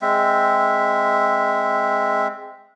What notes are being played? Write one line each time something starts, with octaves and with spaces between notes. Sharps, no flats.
G#3 C4 E5